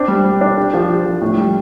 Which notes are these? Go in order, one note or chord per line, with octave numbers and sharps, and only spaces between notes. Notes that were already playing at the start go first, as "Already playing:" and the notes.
Already playing: C4 D4
G3
G3
D4
G4
F3
G4
F3
A2
G3